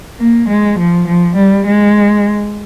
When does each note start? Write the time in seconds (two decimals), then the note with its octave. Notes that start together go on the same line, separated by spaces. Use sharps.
0.19 A#3
0.48 G#3
0.78 F3
1.06 F3
1.35 G3
1.65 G#3